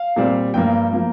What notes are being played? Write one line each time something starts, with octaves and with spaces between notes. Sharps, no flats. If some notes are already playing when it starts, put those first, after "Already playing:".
Already playing: F5
A#2 G3 C4
G2 F3 A#3 G5
F3 A#3